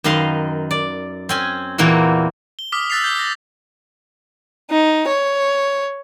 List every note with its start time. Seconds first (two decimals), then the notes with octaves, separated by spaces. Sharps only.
0.04 F#2 D#3 B4 D#5 F5 C6
0.71 D5
1.29 C4 C#4 G#5
1.78 E2 A#2 E3 A#3 C4 F#4
2.59 G7
2.72 D6 D#6 F6 B6
2.90 E6 F#6 A6 B6 C7 F7
3.04 G6 G7
3.19 A#6
4.70 D#4
5.08 C#5